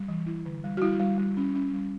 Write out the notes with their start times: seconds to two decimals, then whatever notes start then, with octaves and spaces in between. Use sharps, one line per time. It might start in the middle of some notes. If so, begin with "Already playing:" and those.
Already playing: G3
0.08 E3
0.26 E4
0.46 D3
0.64 G3
0.77 F#4
0.82 G3 E4
1.00 G3
1.18 G3
1.37 C#4
1.55 C#4
1.73 G3